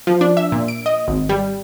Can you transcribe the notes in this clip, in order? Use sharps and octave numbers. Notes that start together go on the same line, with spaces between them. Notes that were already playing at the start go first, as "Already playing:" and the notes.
F3
D4
E5
A#2
D7
D#5
G#1
G3